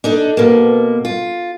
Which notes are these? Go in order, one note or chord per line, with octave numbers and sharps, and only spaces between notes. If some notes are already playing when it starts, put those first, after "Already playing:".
D4 D#4 A4
B2 A#3
F4